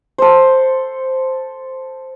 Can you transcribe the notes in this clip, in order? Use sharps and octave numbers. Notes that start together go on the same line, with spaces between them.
A4 C5